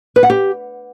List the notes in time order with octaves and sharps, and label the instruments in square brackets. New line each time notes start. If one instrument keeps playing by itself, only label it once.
[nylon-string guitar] B4
F#5
G4